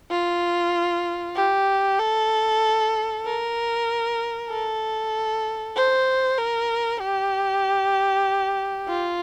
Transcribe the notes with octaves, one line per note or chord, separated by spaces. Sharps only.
F4
G4
A4
A#4
A4
C5
A#4
G4
F4